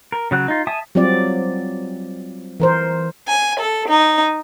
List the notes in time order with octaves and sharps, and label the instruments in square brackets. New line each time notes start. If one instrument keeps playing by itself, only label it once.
[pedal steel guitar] A#4
C#3 F#3 F#6
D#4 F4
E5 G#5 A5 D#6
[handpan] F#3 G3 C4 F4 D5
E3 A#4 C5
[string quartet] G#5
A4
D#4